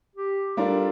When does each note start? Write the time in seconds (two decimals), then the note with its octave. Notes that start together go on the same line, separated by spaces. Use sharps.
0.16 G4
0.57 G3 D4 F4 A4 A#4